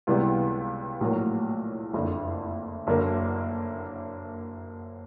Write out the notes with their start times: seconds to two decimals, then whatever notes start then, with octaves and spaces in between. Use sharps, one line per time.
0.07 C#2 C3 E3 G3 B3
1.01 A#1 A2 F#3 A#3
1.93 F#1 F2 D3
2.87 F#1 F#2 D3 F#3 A#3